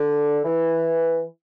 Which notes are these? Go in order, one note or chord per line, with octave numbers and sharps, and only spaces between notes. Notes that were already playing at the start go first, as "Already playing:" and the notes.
Already playing: D3
E3